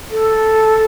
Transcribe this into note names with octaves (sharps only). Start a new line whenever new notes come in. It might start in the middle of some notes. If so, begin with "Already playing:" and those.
A4